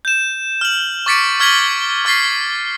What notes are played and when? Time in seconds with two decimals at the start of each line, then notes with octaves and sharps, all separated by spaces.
0.05 G6 E7
0.61 F6 F#7
1.06 C#6 D6 A6 B6 C#7 D7
1.40 C#6 F6 G#6 B6 F#7 G7
2.05 C#6 F6 A6 B6 C7